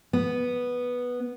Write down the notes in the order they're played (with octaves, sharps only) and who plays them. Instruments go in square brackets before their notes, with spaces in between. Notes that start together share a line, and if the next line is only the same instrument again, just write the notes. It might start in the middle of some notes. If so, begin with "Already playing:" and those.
[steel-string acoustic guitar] B3